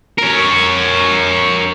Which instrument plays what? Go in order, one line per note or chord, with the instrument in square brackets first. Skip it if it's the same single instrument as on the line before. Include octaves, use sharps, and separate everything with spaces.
[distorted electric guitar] A#4 C#5